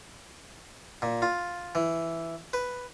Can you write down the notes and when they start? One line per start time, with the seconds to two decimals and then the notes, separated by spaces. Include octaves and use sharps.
1.02 A#2
1.22 F4
1.75 E3
2.53 B4